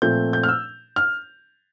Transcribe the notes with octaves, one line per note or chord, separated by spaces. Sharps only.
A#2 F3 A3 C4 G6
G6
F6
E6
F6